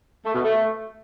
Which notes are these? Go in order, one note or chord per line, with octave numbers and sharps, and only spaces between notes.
A3
B2
A3